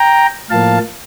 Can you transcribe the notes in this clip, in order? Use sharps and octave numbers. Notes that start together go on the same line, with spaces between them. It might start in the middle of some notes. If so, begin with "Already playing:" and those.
Already playing: G5 A#5
A2 F3 A#3 F5 A5